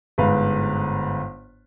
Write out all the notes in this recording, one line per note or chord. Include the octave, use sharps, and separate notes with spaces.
G1 G#2 B4 F5